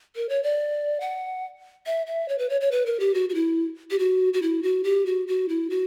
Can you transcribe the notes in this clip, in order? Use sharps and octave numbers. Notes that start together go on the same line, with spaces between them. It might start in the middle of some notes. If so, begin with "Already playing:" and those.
A#4
C#5
D5
F#5
E5
E5
C#5
B4
C#5
C#5
B4
A#4
G4
F#4
F#4
E4
G4
F#4
F#4
E4
F#4
G4
F#4
F#4
E4
F#4